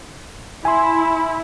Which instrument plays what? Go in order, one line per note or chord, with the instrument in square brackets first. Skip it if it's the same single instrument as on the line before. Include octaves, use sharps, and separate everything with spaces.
[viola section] E4 [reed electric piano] G#5 C6